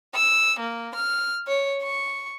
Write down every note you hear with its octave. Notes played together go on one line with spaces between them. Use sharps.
E6
A#3
F6
C#5
C#6